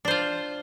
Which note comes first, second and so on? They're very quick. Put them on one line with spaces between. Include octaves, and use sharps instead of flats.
D4 C5 F4